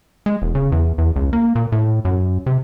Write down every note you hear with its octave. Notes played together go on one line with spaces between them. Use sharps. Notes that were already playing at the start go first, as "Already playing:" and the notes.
G#3
E1
C#3
E2
E2
C#2
A#3
A#2
A2
F#2
C3